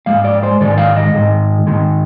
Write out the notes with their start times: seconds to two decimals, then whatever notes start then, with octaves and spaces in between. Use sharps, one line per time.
0.06 G#2 D#3 G#3 F5
0.24 D5
0.43 C5
0.61 G#2 D#3 G#3 D5
0.78 F5
0.96 D#5
1.14 G#2 D#3 G#3
1.67 G#2 D#3 G#3